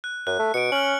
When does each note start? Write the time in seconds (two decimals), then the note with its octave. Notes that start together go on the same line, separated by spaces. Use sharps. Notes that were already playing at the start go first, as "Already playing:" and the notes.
0.04 F#6
0.27 F#2 F#6
0.39 A3
0.54 B2 C#7 D7
0.72 C#4 F6 F#7